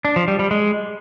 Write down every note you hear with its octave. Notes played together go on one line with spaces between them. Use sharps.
D4
F3
G3
G3
G#3